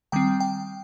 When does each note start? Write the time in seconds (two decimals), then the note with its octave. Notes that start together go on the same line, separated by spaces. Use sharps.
0.12 D#3 G3 C4 G5
0.40 G5